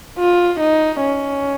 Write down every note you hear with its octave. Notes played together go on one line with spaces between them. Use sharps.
F4
D#4
C#4